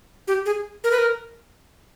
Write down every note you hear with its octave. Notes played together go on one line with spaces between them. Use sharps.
G4
G#4
A#4
B4
A#4